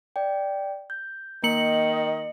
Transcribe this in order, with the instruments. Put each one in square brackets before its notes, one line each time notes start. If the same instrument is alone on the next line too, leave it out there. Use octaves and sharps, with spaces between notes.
[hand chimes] D5 G5
G6
[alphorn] D#3 [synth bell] A#3 C#7 F#7 [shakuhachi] D#5